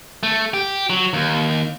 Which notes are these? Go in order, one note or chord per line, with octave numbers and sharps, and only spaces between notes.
A3
G4
F#3
D#2